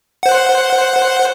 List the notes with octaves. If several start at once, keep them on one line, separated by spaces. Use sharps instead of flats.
C5 F#5